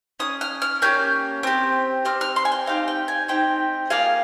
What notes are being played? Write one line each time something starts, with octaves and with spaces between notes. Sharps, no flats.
C#4 G#4 D#6
F6
F6
A#3 C#4 G4 G6
C4 G4
C4 G4 F6
F6
C6
G#5
G5
C4 D#4 G4 F5
G5
G#5
C4 D#4 G4 G5
A#3 F4 G#4 F5